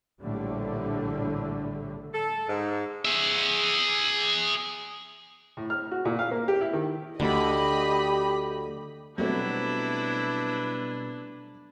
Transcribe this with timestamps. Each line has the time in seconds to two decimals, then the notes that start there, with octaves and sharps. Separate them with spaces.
0.22 A#1 A2 D3 G3 A3
2.14 A4
2.49 G#2
3.05 G#4 E5
5.57 A2
5.70 F6
5.91 F#4
6.05 A#2
6.19 F5
6.31 A#3
6.48 G4
6.61 E4
6.73 D#3
7.20 D2 D3 G4 D#5 B5
9.18 B2 F#3 G3 A3 C4 D4 E4 B4